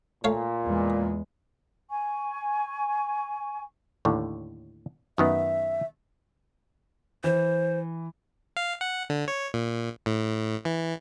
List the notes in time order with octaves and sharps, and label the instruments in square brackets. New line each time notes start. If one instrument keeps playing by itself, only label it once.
[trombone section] A#2 [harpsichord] A3 C#5 F5
[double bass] E2 G#3
[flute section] G#5 C#6
[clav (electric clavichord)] D#2 A2 D3
[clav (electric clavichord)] F#2 D#3 B3 [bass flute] E5
[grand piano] E3 [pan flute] C5
[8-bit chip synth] F5
F#5
D3
C#5
A#2
A2
E3